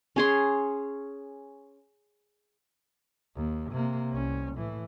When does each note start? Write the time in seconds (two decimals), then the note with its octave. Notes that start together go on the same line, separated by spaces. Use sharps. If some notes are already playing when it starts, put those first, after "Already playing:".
0.16 C#4 G#4 C6
3.36 D#2
3.72 C3 A#3
4.11 C2 C#4
4.55 A2 E3